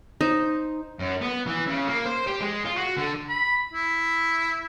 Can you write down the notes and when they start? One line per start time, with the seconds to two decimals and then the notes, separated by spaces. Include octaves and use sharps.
0.21 D#4 C5
0.99 F#2
1.21 B3
1.46 E3
1.67 C#3
1.88 A#3
2.05 C5
2.27 G4
2.41 G#3
2.65 F4
2.77 F#4
2.97 D3
3.29 B5
3.74 E4